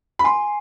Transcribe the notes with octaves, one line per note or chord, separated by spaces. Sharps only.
B5
G#5 C6